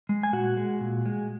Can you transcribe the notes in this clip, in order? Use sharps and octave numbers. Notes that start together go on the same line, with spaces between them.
G#3
G#5
A#2 F#4 F#5
G#3
A#2
G#3